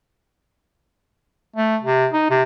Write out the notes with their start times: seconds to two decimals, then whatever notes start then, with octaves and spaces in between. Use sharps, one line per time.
1.56 A3
1.83 C3
2.13 D#4
2.30 C3